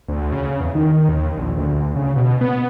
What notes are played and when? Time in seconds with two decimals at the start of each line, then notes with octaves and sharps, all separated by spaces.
0.08 D2
0.32 C#3
0.60 E2
0.75 D#3
1.09 D#2
1.37 A#1
1.57 D2
1.96 C#3
2.16 B2
2.41 B3